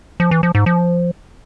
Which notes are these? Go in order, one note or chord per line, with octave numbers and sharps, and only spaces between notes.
F3
E3
F3
G#2
F3